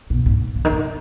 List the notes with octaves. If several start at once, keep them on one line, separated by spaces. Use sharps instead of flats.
B2
G#2
C#3
D#3
C#3